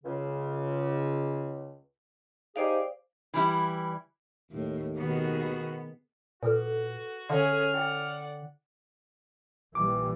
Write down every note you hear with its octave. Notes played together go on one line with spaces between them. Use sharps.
C#2 C#3
D#4 G4 G#4 C5 D5 F5
E3 G3 E4
D#2 A2
B2 D#3 B3 F#4 G#4
A#2 F#4 G#4 A4 B4
D3 C#4 G#4 A4 E5 F5 F6
E4 D5 F#5 G5
A#1 E3 G3 D6